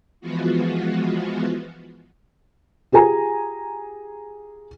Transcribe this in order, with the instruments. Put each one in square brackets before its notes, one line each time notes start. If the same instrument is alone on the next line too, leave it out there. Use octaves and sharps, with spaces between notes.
[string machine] E3 F3 G#3 B3 F4 F#4
[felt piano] F4 G4 G#4 G#5 A#5